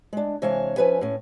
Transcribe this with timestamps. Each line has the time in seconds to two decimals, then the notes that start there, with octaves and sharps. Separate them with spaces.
0.13 G#3 D4
0.42 C3 E3 G#3 C#5 F5 A5
0.76 F3 C#4 B4 E5 G#5
1.01 A2 C#4